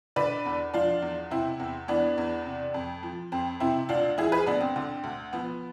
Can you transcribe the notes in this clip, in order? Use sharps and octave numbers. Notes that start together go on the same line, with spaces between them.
D3 B4 D5
E2
F3 D4 F4
E2
C3 C4 E4
E2
E3 B3 D4
E2
C3
F2
F3
F2 C4
C3 C4 E4
D2 D4 F4
F3 E4 G#4
G#4 B4
D2 B3 D4
C4
D3
D2
F3 B3